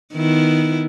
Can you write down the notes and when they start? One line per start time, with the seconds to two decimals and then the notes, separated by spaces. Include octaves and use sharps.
0.14 D#3 B3 E4